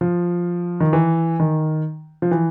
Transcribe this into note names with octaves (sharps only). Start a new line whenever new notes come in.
F3
D#3
E3
D#3
F3
E3